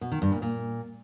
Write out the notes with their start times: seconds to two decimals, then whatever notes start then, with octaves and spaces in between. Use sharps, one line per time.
0.01 B2
0.12 D#3
0.22 G2
0.32 A#2
0.42 A#2